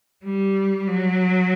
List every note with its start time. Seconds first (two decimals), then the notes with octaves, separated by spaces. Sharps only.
0.25 G3
0.87 F#3